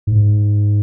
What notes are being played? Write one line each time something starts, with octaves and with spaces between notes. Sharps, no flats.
G#2